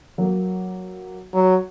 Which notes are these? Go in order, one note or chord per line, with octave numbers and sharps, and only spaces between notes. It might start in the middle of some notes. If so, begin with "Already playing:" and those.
F#3 A#3
F#3